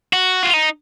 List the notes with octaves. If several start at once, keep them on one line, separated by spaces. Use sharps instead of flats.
F#4
F4
D#4